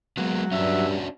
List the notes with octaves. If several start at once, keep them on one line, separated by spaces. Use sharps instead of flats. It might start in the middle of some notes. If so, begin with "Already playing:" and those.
F#3 G#3 A#3 B3
G2 G3 C#4 D4 F#4 E5